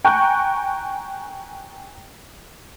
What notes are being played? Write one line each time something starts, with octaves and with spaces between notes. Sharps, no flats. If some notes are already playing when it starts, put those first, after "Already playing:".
G5 G#5 A#5 C#6 F#6 G6